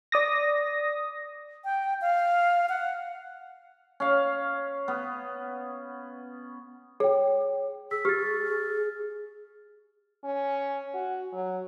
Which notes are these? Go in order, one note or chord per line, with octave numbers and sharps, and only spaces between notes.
D5 D#6 A#6
G5
F5
F#5
C#4 F5
B3
G#4 C#5 G5
G#4 E6 B6
G4 F6 A6
C#4
F#4
F#3